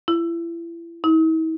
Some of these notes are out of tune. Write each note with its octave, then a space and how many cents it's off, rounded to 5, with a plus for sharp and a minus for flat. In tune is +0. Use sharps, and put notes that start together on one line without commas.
E4 +35
E4 -45